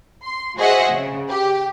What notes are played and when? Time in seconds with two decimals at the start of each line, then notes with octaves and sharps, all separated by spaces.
0.23 C6
0.57 F#4 G#4 C5 D#5 E5 F#5
0.92 C#3
1.29 G4